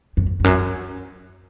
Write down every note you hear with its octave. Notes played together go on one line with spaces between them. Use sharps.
F#2
F2
F#2